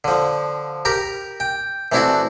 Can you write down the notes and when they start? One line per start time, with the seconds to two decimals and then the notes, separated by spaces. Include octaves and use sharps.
0.04 D3 F3
0.85 G4 A#4 A#5 B5
1.40 G5
1.92 E3 A3 C4 D4 E4 F#4